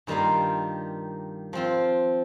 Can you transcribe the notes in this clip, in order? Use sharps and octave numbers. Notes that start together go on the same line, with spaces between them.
G2 D#3 G3 A#3 F4
F3 C4 F4